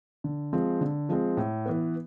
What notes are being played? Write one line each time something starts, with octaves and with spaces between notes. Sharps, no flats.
D3
F3 G#3 C4
D3
F3 G#3 C4
A2
E3 B3